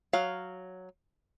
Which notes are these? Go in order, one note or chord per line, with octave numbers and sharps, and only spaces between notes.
F#3 F5